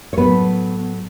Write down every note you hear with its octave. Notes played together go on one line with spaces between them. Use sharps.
C#5
A2 F#3 A3 B3 B4